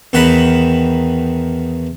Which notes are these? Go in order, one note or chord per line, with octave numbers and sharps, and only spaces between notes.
E2 D#3 D#4 F#5 A5 B5